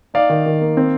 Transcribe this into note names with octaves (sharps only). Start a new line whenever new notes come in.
D#4 D5 F5
D#3
D#3
A#3
C4